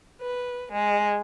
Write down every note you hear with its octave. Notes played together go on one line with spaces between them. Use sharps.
B4
G#3